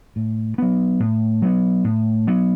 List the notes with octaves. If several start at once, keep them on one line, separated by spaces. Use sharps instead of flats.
A2
F#3 B3
A2
F#3 B3
A2
F#3 B3